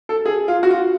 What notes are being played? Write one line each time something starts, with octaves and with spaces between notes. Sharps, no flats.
A4
G#4
F4
F#4
F4